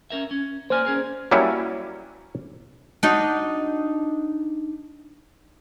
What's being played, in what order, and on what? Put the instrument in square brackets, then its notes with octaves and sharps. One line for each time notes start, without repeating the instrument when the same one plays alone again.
[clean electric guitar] C#4 A#4 E5
C#4
[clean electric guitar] A#3 D5 G#5 [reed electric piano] C5 F6
[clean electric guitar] C#4 G#4 A#4
[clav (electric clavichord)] F#3 G3 A#3 C#4 E4
[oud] D4 D#4 F#4